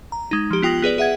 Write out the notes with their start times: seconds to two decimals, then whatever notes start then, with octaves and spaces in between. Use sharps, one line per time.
0.12 A#5
0.31 G#3 D#4
0.51 F3 G4
0.62 B3 F4 G5 D#6 A#6 F#7
0.82 B3 G#4 B4 D5
0.98 G#4 E5 F#5 G#6